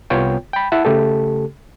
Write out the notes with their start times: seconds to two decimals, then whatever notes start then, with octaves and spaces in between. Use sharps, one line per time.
0.10 C2 B3 F4 C#5 G5
0.53 G5 B5
0.72 E4 E5 F#5 A5
0.85 C#3 A3 G4 A4